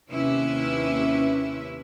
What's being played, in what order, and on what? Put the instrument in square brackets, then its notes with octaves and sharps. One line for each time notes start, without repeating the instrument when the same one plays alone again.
[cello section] D#2 C3 C#4 E4 B4 E5